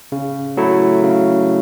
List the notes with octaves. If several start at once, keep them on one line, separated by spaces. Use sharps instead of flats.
C#3
F#3 A3 E4
C#3